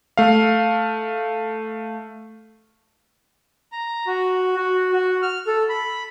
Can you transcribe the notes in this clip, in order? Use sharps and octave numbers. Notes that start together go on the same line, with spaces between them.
A3 F5
A#5
F#4
F#4
F#4
F6
A4
B5